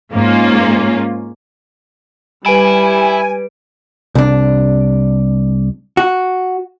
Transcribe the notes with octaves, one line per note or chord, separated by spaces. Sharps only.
G#2 A#3 C#4 F4
G3 E4 B4 G#5 D7
C2 D4
F#4